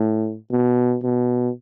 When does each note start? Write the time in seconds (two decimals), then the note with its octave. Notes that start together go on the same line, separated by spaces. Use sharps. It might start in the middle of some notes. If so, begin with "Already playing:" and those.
Already playing: A2
0.51 B2
1.03 B2